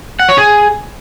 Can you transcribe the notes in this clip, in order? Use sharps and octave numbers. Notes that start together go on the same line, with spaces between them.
F#5
C#5
G#4